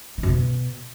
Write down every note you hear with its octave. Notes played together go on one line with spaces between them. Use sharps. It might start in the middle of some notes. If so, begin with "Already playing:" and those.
D#3
F#2
B2